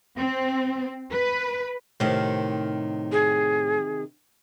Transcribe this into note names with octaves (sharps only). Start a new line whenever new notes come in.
C4
B4
A2 C3 D#3
G#4